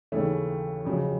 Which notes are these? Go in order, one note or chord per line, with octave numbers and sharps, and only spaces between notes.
D#2 C#3 E3 A3 C#4
F2 C#3 F#3